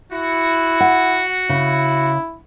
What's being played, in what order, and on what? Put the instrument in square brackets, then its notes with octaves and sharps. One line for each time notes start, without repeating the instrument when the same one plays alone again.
[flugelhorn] E4 [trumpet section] F#4
[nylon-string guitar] F#5
[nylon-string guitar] C#3 [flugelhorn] E4